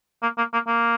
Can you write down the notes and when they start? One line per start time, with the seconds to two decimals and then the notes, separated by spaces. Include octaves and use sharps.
0.23 A#3
0.38 A#3
0.54 A#3
0.67 A#3